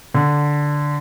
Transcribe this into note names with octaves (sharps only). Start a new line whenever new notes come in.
D3